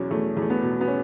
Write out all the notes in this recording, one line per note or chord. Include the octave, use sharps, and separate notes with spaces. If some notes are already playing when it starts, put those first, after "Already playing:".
Already playing: E2 B2 F#3 C#4
E2 A3
E2
A3
B3
B2
B3
C#4